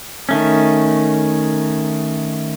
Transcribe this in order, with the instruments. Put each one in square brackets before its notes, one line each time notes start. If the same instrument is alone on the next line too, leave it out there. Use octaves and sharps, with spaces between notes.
[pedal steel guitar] D#3 A3 C#4